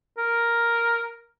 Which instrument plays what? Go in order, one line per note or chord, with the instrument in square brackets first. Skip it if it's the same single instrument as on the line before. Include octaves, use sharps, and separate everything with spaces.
[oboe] A#4